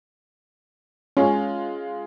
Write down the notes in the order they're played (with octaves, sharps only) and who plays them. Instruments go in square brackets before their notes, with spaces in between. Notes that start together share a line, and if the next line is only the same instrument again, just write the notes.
[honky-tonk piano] G#3 F4 [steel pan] C#4